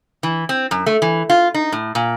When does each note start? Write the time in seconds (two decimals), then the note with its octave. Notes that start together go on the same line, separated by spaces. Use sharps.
0.23 E3
0.49 C4
0.71 F#2
0.86 A3
1.02 E3
1.30 F4
1.54 D#4
1.72 A2
1.95 A#2